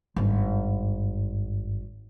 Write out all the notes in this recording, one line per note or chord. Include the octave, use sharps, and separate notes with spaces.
G#1 G2